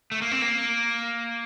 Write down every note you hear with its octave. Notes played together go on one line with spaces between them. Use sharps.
A3
A#3
C4
A#3